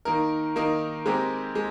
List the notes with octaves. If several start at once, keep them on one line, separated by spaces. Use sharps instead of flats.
D#3 A#3 D#4 A#4
D#3 A#3 D#4 A#4
G#3 C4 G4 A#4
G#3